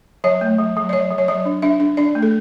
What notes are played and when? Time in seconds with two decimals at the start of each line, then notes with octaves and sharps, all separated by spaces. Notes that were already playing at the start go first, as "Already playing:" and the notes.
0.24 F#3 C#5
0.41 A3
0.58 F#3
0.77 F#3
0.89 D5
0.93 F#3 C#5
1.11 F#3
1.18 C#5
1.28 F#3 D5
1.45 D4
1.62 D4 E5
1.80 D4
1.97 D4 D5
2.15 A3
2.22 A4